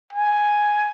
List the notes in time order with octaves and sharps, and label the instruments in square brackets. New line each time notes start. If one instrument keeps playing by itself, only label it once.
[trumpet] G#5